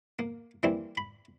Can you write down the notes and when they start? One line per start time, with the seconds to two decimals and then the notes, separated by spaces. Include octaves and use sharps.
0.19 A#3
0.63 E3 G3 A#3 C4
0.97 B5